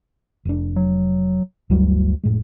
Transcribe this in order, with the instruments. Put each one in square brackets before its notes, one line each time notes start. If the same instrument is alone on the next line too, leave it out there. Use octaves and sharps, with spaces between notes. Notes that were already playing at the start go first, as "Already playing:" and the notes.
[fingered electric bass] F1 D4
[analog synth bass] F#3
[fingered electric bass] G1 F#3 G3 [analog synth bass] D2
[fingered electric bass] F1 A2 G#3